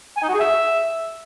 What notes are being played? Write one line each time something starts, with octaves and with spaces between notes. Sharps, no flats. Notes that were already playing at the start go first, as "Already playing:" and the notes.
G#5
D#4
F#4
G#4
E5